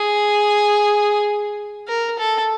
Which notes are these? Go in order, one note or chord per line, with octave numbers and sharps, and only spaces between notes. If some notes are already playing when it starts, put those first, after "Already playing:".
Already playing: G#4
A#4
A4